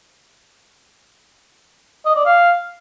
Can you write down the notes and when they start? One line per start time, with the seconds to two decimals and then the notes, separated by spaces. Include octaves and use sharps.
2.06 D#5
2.16 D5
2.26 F5